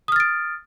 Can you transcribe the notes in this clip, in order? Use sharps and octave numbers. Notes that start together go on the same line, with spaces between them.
D#6 F6 A6 D7